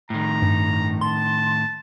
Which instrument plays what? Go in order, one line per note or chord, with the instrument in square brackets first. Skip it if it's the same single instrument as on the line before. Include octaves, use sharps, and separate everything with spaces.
[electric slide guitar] A2 D#3 [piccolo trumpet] A#5
[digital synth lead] G2
[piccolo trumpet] A5 [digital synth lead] C6